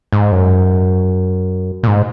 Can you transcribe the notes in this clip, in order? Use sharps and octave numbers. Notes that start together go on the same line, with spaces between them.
G#2
F#2
A#2
G#2